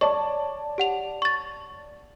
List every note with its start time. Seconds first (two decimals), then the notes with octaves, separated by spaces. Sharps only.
0.01 C#5 D5 A5 C#6
0.78 G4 F#5 F7
1.22 C#6 A6